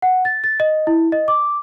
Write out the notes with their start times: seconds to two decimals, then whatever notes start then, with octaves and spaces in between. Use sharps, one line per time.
0.02 F#5
0.25 A6
0.44 A6
0.60 D#5
0.87 E4
1.12 D#5
1.28 D6